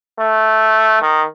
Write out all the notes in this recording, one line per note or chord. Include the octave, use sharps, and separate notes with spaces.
A3
D#3